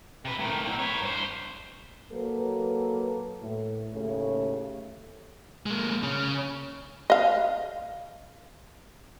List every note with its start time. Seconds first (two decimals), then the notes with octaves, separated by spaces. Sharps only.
0.25 C3 B4
0.39 A2 D#3
0.66 B2 C4
0.79 B4 C#5
1.02 G2 C5
2.12 F#3 A#3 A4 B4
3.42 A2
3.93 D#2 A2 C#3 A3 G4 C#5
5.66 G#3 A#3
6.03 C#3 C#4
7.10 D#5 F5